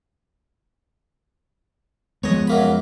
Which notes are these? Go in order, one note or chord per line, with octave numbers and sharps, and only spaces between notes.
F3 G#3 B3 C#5 D#5
F#2 A#3 B5